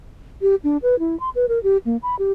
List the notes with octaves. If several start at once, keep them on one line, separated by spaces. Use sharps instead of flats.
G4
D4
B4
E4
C6
B4
A#4
G4
A#3
B5
G4